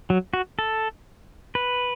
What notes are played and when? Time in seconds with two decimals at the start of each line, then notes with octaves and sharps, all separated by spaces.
0.10 F#3
0.34 F#4
0.59 A4
1.55 B4